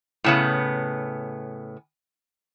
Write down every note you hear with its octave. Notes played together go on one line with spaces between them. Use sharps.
A2 C#3 B3